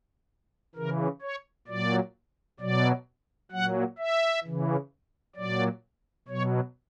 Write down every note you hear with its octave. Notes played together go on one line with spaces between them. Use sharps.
C#3 E3 A#4
C#5
A#2 F#3 D5
B2 F#3 D5
A#2 F#3 F#5
E5
C#3 E3
A#2 F#3 D5
B2 F#3 C#5